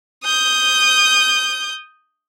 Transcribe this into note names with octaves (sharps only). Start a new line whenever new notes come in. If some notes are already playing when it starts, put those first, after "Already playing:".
D#6 G6